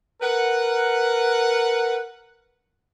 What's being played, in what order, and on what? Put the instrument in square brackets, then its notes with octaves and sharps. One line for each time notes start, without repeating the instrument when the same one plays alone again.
[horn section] A#4 B4 F#5